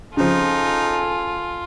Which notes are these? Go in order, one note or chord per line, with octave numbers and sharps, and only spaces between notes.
C#3 F3 D#4 F4 A4 G#5